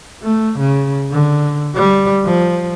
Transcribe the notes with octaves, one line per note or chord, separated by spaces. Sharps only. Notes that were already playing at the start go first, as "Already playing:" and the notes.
A3
C#3
D3
G3
F3